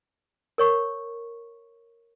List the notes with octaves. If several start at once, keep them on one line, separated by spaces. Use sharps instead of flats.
A#4 C#5 C#6